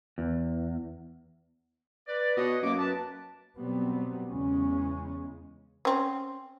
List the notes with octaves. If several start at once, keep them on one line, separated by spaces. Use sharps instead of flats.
E2
B4 D5
B2 B4 C#5 D#5
F#2 A#3 D6
B4 A5
B2 F#3 G3 B3 C4
E2 C#3 G#3 C#4
C4 C#4